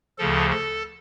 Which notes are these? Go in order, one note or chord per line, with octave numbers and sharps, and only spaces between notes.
D2 C#3 F3 A4
A4